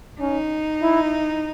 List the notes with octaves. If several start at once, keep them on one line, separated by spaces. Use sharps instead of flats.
C#4 D#4
E4